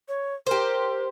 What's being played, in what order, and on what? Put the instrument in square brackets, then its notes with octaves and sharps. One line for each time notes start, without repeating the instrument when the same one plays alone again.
[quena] C#5
[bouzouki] G4 C5 [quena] A#4